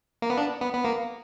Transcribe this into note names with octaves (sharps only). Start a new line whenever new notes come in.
A#3
B3
D4
B3
B3
A#3